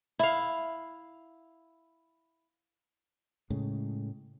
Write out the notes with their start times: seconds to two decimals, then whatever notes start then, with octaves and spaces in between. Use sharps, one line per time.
0.19 E4 F5
3.50 A2 C#3 G#3